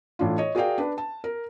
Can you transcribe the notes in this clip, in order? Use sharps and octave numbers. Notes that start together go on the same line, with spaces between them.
A2 E3 D4 F4
C#5 D#5
F#4 G#4 A#4 D5 F5 G5
D4 B4
A5
A#4